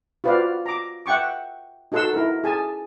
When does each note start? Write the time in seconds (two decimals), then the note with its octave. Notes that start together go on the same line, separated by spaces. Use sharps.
0.24 F4 F#4 B4 C5 D5 F5
0.66 A#5 D6
1.06 E5 F#5 G5 C#6 D6
1.92 D#4 F#4 A4 F#5 C6 E6
2.13 E4 A#4
2.44 G#4 G#5 A5